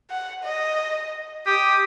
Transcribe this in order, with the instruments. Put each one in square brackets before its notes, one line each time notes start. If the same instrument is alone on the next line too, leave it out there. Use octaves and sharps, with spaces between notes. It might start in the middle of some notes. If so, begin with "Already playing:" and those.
[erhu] F#5
D#5
[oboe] G4 [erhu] D#6